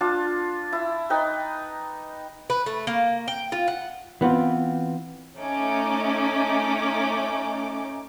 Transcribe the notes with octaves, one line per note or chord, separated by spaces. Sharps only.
D4 F4 A5
E4
D#4 B4 G5
B4
A3
A#3
G5
F4
F#5
E3 B3 C4 F4
A3 C#4 D#4 D6